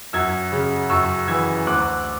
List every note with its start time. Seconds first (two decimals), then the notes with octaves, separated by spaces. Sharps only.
0.13 F#2 E6 G#6
0.52 C#3
0.90 F#2 C#6 E6
1.28 E3 E6 G#6
1.66 D2 D6 F#6